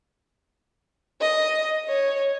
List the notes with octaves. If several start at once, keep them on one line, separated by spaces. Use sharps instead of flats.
D#5
C#5